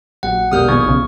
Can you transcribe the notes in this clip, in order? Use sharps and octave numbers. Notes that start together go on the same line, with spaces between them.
A#1 F#3 F#5
E1 A#3 G4 D#6 F6 G6
D#3 F3 B3 C#6 G#6
B1 C#3